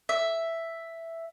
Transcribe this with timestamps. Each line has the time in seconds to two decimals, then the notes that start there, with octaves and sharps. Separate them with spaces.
0.09 E5